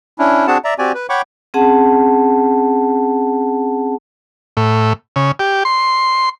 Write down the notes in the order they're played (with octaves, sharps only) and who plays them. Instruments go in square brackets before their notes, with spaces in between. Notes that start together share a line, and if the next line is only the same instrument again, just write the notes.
[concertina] C#4 D4 E4
C4 D4 F#4 G#4 F#5 A5
D5 E5 A#5
C4 F#4 G4 D5 G#5
B4
C#5 F#5 G5 B5 C#6 D6
[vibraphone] C4 C#4 G#4 F#5 A5
[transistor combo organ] A2
C#3
G4
C6